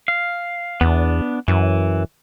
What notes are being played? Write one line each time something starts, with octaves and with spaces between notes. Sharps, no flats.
F5
E2 B3 D4
F#2 E3